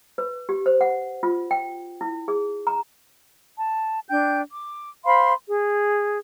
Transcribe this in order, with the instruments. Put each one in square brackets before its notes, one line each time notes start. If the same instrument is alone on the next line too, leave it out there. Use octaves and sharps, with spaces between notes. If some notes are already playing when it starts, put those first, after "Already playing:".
[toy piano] B4
G4
C5
F#5
F4
G5
E4
G#4
A#5
[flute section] A5
D4 G5 G6
D6
C5 F5 B5 C6
G#4